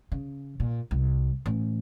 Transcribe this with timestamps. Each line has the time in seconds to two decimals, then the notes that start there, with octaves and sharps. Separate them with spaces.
0.12 C#3
0.60 A#2
0.91 C2
1.46 A1